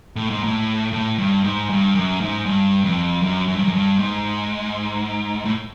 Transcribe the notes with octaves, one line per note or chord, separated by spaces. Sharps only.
A2
G#2
A2
A2
G2
G#2
G2
F#2
G#2
G2
F2
F#2
F#2
G2
F#2
G2
G#2
A2